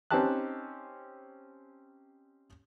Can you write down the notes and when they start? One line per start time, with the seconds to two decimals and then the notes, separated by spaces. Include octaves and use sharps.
0.11 C4 C#4 D#4 G4 A5 F#6